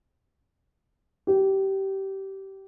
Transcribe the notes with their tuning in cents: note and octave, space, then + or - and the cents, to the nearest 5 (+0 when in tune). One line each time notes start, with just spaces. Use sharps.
G4 -20